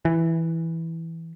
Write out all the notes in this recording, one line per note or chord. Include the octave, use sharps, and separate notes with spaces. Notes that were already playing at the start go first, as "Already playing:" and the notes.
E3